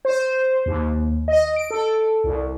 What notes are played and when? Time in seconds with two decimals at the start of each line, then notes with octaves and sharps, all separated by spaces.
0.05 C5
0.66 D#2
1.28 D#5
1.56 D7
1.71 A4
2.24 C2